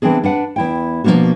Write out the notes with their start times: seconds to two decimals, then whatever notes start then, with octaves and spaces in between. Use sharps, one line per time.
0.02 E3 B3 C4 D4 G#4
0.23 D4 B4 F#5
0.56 E2 E4 G5
1.04 B2 F3 A3 A#3 D4 F#4